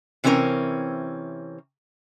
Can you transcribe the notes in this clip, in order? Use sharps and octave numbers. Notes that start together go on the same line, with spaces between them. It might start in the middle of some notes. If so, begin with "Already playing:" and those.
C3 E3 C4 C#4 A#4 C#5